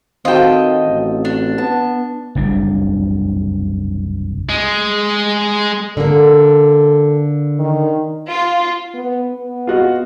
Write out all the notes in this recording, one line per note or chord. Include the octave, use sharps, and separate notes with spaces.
D#3 C4 D#4 F4 F#4 A4 D#5 G5
A1
D4
B3 A5
F#1 C2 C#3 D4
G#3
D3 A#3 A4
D#3
F4
B3
B3
F4 F#4 D#5